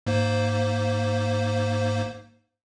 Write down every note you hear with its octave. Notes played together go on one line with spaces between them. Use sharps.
G#2 A#3 C5